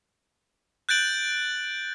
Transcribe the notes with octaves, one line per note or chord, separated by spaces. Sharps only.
F#6 G6 A6 D7 F#7